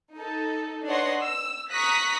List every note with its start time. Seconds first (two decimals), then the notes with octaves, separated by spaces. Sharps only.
0.13 D#4 A4
0.86 D4 B4 C#5 D#5 F#5 C6
1.21 E6
1.72 A#5 C#6 D#6 F#6 A#6 B6